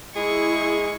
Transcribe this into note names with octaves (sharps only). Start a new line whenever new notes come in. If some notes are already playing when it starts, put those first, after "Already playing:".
G#3 E4 G#4 C#6